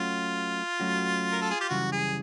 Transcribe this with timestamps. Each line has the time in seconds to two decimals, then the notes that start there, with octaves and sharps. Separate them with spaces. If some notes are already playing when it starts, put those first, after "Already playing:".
Already playing: F#3 A3 C#4 F4 F#4
0.80 F#3 A3 C#4 F#4
1.32 A#4
1.42 A4
1.51 G#4
1.61 G4
1.69 F#2 C#3 E3 G3 F#4
1.92 G#4